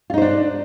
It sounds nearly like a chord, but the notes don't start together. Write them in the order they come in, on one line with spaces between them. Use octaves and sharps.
F4 D#4 C5 D4